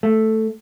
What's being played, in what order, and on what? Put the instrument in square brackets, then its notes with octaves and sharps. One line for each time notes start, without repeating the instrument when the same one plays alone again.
[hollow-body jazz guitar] A3